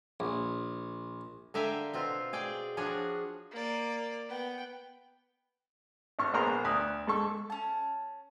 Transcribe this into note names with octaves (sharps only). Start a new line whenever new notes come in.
A#1
D3 A#4 E5 F5 G5 G#5
B2 C4 F4
G#4 D5 G5
F3 D4 F#4 G#4 C#5
A#3 D5
B3 G5
G#1 C#6 F6
A#1 B3 G#4 A#4 C5 A#5
D2 D#6 F#6
G#2 A4 C#6
C#4 A5